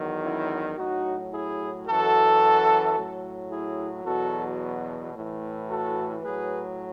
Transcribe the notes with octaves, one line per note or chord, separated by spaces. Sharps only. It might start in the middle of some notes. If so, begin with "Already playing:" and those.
Already playing: E2 D#3 F#3
C#4 E4
A2 F#3 D#4 F#4
E4 G#4
F#2 E3 F#4 A4
A2 F#3
E4 G#4
E2 B2 F#3 F#4 A4
A2 E3
F#4 A4
A2 F#3 G#4 B4